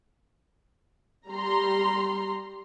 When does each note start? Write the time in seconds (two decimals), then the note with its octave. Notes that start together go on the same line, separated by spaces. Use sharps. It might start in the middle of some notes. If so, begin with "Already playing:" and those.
1.27 G3 A#5 C6